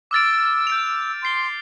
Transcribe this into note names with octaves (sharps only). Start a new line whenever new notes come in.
D6 E6 F6 A6 D7
G6 D7 F7
C6 G6 C7 G7